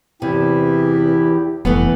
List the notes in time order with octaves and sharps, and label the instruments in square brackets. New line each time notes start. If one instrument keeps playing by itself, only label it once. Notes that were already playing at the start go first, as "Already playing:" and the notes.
[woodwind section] E2 E4 [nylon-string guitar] C3 [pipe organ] E3 G4
[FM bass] F1 [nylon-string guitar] E3 A3 B3